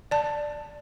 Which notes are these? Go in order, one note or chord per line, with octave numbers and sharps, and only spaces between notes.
D5 A5